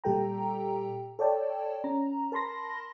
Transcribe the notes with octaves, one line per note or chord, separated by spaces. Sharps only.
A#2 G3 G4 A4 G5 A#5
A4 C#5 D5 G5 A5
C#4 A#5
A#4 A5 B5 C6 A#6